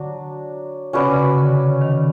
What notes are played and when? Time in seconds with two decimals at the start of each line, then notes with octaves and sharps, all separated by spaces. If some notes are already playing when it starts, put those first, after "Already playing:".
Already playing: D3 F#3 D4 F#4
0.93 C#3 C#4 F#4 B4 D5
1.04 C3
1.14 C#3
1.38 D3
1.81 D#3